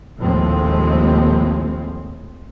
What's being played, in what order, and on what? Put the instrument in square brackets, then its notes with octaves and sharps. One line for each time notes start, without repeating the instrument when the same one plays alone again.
[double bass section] A#1 D#2 A2 F3 G#3 C4